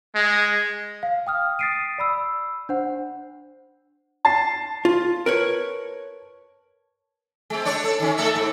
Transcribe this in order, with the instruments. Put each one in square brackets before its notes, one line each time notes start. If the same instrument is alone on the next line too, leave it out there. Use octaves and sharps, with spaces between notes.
[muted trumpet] G#3
[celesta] F5
G5 D#6 F6
D#6 A6 B6 C7 D7 D#7
D5 B5 E6
D4 C5 F#5
[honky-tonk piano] A5 A6 C7
[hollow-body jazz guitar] F4
A#4 B4 C#5
[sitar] G#3 C4
D4 C#5 D5
A4
D#3 C#4
A3 A4 E5
G#2